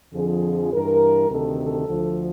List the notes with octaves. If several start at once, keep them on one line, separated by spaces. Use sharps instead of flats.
F2 D3 F3 G#4
G2 E3 A#4
D2 C3 D#3 A4
A4
D2 D3 F3